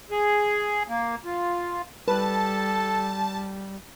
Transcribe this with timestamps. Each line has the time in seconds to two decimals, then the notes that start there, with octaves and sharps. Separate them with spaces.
0.11 G#4
0.88 A#3
1.25 F4
2.08 G3 A4 B4 A5